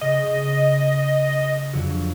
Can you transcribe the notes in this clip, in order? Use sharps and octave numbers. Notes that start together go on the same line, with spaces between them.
C#3 D#5
F2 D3 F#3